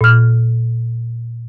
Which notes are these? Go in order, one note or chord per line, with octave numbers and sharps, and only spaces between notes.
A#2 F6